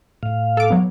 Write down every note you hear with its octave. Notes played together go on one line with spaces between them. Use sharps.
A2 F5
A4 D6
F#3 B3